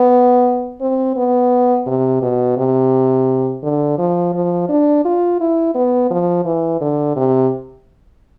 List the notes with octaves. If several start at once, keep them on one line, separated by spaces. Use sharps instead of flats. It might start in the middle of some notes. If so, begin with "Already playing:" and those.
Already playing: B3
C4
B3
C3
B2
C3
D3
F3
F3
D4
F4
E4
B3
F3
E3
D3
C3